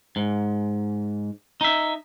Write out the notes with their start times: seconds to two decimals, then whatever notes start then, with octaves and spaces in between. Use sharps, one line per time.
0.16 G#2
1.61 D#4 E5